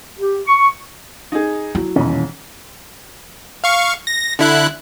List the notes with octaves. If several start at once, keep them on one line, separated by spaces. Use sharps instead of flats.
G4
C#6
D#4 G#4
F#3 E4
D#1 B1 E2 C#4
F5 C#6
A#6
D3 E4 F#6